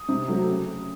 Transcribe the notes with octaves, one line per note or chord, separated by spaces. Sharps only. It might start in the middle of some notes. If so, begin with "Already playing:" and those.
Already playing: D#6
C3
F#3 A3 C4
C#3